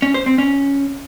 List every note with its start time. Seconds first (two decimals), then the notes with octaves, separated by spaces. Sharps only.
0.02 C#4
0.14 C5
0.26 C4
0.38 C#4